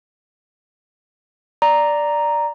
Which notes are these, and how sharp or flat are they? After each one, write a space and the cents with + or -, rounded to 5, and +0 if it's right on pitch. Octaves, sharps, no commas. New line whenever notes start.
D5 +0 A#5 +0